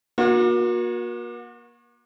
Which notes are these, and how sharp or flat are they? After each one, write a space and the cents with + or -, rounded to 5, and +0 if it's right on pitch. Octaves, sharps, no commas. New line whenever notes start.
A#3 +35 F#4 -35